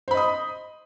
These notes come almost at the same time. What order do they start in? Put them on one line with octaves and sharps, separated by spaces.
C5 B5 D#5 D#6